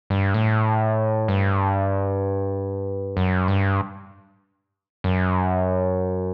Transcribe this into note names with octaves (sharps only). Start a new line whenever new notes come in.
G2
A2
G2
F#2
G2
F#2